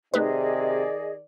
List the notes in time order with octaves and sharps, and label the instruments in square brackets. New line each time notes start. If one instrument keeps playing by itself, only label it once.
[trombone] C3 [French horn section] D#3 D5 [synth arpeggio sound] A3 D#4 B4 [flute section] G#4 D#5